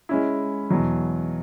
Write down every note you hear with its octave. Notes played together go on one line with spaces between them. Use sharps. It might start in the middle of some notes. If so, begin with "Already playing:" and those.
G#3 C#4 E4
E2 B2 F#3